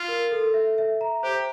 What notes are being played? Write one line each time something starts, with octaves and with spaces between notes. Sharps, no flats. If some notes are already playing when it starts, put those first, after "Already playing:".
Already playing: F4
A#4
A4
E5
E5
A#5
G4 C5